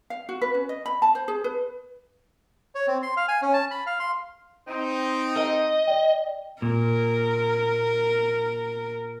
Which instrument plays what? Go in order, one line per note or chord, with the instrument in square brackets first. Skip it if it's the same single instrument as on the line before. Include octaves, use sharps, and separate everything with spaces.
[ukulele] F5
F#4
B4
C#4
D#5
B5
A5
C5
G#4
B4
[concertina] C#5
C4
C6
F5
G#5
C#4
A5
B5
F5
C6
[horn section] C4 D#4
[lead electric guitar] D#5
[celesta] D5 G5
[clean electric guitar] A#2 [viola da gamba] A#4